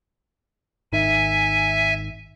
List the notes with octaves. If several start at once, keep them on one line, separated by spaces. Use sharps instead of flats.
G#1 D#3 E5 G#5